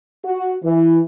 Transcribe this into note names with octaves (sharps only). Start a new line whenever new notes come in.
F#4
E3